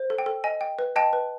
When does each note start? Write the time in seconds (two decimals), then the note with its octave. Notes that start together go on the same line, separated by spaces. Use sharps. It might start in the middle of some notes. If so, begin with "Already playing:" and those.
Already playing: C5
0.10 A4
0.18 G5
0.26 A4
0.44 D#5 G#5
0.61 G5
0.79 B4
0.96 D#5 G5 A5
1.13 B4